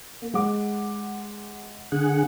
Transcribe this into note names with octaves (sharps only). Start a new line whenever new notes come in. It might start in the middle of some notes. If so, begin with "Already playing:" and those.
A#3
G#3 F#5 D6
D3 G#4 F#5